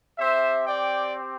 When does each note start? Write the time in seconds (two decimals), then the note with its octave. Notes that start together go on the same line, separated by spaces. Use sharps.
0.19 C4 G4 C5 E5
0.65 D5 G5